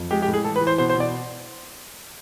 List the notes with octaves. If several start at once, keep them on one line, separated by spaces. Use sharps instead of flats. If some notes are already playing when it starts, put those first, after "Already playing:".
Already playing: F2
G#3 G4
G4
A2
G#4
E3 A4
B4
E3
C5
B2 C5
C5
B2 D5